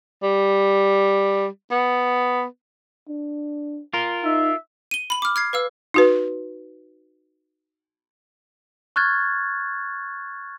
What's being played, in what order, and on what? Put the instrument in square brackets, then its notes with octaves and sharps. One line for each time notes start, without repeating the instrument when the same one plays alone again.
[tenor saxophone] G3
B3
[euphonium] D4
[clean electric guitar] F4 A#4
[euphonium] D#4 [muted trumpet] E5
[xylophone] D#7 G7
B5 F#7
D6 F6
F6 G#6 C7
B4 F5 E6
[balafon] D#4 F#4 B4
[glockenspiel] C#6 F6 F#6 G#6 A6